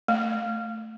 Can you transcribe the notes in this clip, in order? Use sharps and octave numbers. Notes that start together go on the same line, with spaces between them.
A3